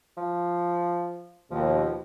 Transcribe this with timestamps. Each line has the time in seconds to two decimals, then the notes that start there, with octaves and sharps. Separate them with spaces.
0.17 F3
1.51 D#2 B2 F3